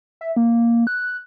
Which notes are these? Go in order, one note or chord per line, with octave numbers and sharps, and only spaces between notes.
E5
A#3
F#6